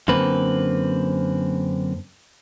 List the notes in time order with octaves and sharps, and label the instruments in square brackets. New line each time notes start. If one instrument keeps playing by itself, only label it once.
[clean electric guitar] F#2 D3 A#3 C4 B4